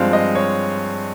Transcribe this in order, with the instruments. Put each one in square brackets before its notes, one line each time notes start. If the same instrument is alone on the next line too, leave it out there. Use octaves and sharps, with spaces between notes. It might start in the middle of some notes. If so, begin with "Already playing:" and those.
Already playing: [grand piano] G2 F3 G#3 C4 F5
D#5
C#5